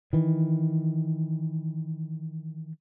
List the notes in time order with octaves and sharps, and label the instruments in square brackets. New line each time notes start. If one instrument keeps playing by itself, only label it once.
[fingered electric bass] D#3 E3